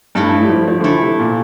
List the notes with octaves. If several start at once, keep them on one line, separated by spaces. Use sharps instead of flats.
G2 A3 E4 A4
A2
G3
F3
F3
D3
E3 A3 E4 A4
C3
A#2